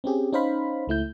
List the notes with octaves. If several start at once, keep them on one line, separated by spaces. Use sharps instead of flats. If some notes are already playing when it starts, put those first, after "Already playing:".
C4 C#4 G4 G#4
C#4 D#4 C5 F5 B5
C#2 A3 E4 G6